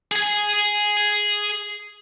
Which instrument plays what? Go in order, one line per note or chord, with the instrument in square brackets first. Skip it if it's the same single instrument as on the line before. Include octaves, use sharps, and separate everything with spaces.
[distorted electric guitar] G#4 G#5